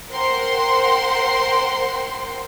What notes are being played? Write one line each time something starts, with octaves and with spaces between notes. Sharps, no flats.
A#4 C5 F#5 G5 C6